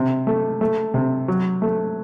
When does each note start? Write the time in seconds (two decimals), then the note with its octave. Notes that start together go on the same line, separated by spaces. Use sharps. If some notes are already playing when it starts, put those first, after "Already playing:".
Already playing: C3
0.27 A3
0.61 A3
0.94 C3
1.28 F#3
1.62 A3